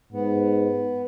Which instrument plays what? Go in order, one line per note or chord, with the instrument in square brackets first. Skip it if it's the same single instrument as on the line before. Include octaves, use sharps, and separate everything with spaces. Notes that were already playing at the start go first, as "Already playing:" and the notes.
[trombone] G#2 [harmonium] B3